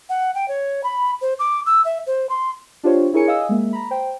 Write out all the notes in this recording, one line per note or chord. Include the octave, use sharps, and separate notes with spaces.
F#5
G5
C#5
B5
C5
D6
E6
E5
C5
C6
D4 F4 G4 C5 C#5
E4 G#4 A#4 C#5 G#5 C#7
D#5 F5 G#5 D#6 E6
G#3 A#3 E5
A#5 B5
C5 G5